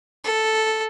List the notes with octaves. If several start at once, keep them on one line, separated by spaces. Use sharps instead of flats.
A4